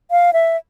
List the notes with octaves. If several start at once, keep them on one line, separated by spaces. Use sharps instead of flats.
F5
E5